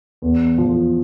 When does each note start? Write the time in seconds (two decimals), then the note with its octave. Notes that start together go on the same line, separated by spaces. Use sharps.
0.22 E2
0.58 F3